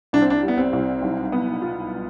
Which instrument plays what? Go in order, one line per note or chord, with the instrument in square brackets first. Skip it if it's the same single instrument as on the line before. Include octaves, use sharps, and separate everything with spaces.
[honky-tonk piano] C2 [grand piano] D4
[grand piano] C4
D4
[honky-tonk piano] G3
[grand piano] B3
C4
[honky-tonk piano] C2
B1
B3
F4